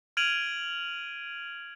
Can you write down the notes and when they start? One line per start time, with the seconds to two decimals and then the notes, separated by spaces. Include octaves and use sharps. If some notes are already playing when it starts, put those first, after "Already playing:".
0.17 F6 G#6 D7 D#7 F7 F#7